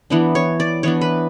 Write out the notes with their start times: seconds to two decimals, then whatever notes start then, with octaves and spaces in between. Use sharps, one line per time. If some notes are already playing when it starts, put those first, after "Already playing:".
0.10 E3 B3 D4
0.35 C#5
0.60 D5
0.83 E3 B3 D4 C#5
1.01 B4